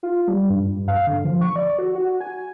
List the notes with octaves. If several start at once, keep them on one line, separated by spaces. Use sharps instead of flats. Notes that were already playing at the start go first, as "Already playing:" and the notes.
F4
G3
G2
F5
D3
F3
C#6
D5
F#4
F#4
G#5